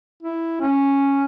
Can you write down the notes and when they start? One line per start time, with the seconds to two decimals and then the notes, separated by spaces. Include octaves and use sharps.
0.23 E4
0.61 C#4